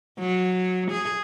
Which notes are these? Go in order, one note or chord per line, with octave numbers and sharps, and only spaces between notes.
F#3
G#4